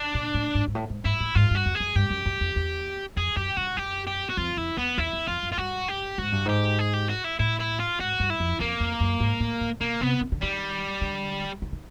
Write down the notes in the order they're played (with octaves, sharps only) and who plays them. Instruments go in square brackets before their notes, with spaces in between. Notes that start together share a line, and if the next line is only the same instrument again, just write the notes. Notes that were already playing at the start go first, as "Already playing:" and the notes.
Already playing: [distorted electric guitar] D4
[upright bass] A#2
A2
G#2
G#2
A2
G#2
[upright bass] G#2 [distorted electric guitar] E4
[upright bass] A2
[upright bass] G#2 [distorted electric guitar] F4
[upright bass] G2 [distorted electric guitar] F#4
[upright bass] F2
[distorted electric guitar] G#4
[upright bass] F#2
[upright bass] G2 [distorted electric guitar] G4
[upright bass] F#2
F#2
F2
E2
[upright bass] F2 [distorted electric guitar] G#4
[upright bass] F#2 [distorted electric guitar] G4
[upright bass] G2 [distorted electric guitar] F#4
[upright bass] F#2 [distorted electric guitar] G4
[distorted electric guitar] G4
F#4
[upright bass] F2 [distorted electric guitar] F4
[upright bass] F2 [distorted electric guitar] E4
[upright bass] E2 [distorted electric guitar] B3
[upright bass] E2 [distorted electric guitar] E4
[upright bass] E2
[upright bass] F2 [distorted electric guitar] F4
[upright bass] F#2
[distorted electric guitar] F4
[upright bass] G2 [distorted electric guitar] F#4
[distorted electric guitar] G4
[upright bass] G#2 [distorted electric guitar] F#4
[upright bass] G2
[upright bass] G#2 [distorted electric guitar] G4
[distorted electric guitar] G#4
G4
F#4
E4
[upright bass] A2 [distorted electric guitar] E4
[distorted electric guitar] E4
F4
[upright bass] G#2 [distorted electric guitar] F#4
[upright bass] G2
[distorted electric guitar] E4
[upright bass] F2
[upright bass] F2 [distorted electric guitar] A#3
[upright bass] F2
F#2
G#2
A2
A2
[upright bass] B2 [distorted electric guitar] A#3
[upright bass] C3 [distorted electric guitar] B3
[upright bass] D#3
D3
[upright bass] D#3 [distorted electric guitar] G3
[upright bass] D3
D#3
D#3